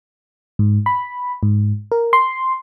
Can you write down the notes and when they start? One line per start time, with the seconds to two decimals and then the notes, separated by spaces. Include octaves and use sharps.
0.59 G#2
0.86 B5
1.43 G#2
1.92 A#4
2.13 C6